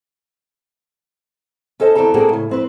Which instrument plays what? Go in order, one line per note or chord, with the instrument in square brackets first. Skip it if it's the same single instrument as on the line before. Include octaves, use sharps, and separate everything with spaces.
[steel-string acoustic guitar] C#4 A4 C5 D#5 F#5 A5
E2 G#2 D3 C4 A4 A#5
A#3 C4 D4 F#4 G#4 A4
A2 C#3
F2 C4 B4